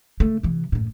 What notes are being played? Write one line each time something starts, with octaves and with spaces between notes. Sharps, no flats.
C#3 A3
C3 E3
F#1 A2